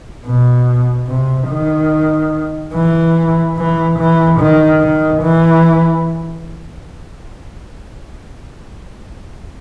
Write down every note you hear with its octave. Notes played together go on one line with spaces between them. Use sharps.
B2
C3
D#3
E3
E3
E3
D#3
D#3
E3